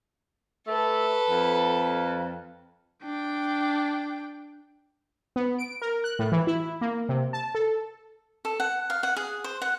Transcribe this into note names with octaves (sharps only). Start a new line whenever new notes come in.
A3 A4 B4
F2
D4 G5
B3
D7
A#4
F#6
A2
E3
E4
A#3
C3
A5
A4
A4
F#5
F5
F#5
G#4
C5
F#5